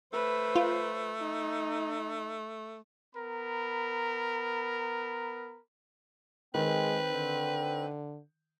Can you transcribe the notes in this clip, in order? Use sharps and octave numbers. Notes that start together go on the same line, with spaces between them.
A3 B4 C5
F4
D#4
B3 A#4 A#5 B5
D#3 G#3 C4 B4
D3